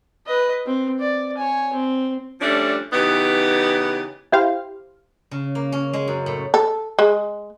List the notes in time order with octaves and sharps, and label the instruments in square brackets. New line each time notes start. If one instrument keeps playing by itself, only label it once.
[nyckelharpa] B4 D#5
C4
D5
C#5 G#5
C4
[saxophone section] F3 G3 A3 C#4 D4
C#3 E3 B3 D#4 G4
[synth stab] E4 G4 C5 F5
[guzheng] C#3
A#3
C#4
G#3
F#2
A2
[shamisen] A4
G#3